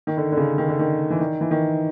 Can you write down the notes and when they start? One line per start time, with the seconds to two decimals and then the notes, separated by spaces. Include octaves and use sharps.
0.07 D#3
0.17 D3
0.32 D3
0.37 C#3
0.58 D#3
0.69 D3
0.79 D#3
1.10 E3
1.20 D#3
1.41 E3
1.51 D#3